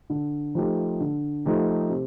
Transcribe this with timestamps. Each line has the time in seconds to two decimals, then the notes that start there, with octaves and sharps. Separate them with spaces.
0.10 D3
0.55 F3 A3 D#4 G4
1.00 D3
1.45 F3 A3 D#4 G4
1.90 C3